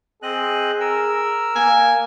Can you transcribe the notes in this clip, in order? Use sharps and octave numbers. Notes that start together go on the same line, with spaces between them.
C4 G#4 D#5 F#6
A#4 E6
A#3 G#5